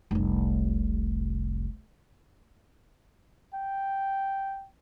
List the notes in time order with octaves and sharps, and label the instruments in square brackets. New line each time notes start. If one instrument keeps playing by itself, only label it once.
[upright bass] F1 C2
[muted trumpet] G5